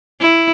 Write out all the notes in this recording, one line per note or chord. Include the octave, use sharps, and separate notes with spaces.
E4